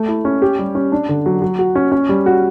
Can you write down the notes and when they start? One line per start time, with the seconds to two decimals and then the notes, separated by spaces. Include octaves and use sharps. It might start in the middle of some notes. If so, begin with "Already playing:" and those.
Already playing: A3
0.08 E4
0.25 C#4
0.42 G4
0.59 G3
0.75 C#4
0.92 D4
1.09 D3
1.26 F#3
1.42 F#3
1.59 F#4
1.75 C#4
1.92 C#4
2.09 G3
2.26 F#4